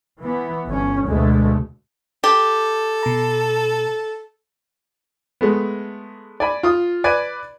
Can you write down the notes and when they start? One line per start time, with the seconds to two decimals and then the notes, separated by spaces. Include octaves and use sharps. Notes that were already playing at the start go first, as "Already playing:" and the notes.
0.20 E3 B3
0.67 G1 C#4
1.05 D2 B2 G#3 A3
2.24 G4 A4
3.03 B2 A#5
5.41 G#3 A3 B3
6.40 D5 G#5 B5
6.63 F4 D#6
7.04 B4 D5 G#5